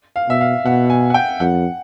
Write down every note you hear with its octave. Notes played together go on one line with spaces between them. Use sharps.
F5
B2 E5
F5
B2 F#5
G#5
F#5
G5
F2 F#5